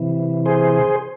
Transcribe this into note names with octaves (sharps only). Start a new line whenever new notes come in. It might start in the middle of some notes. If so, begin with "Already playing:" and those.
Already playing: C3 E3
G#4 C5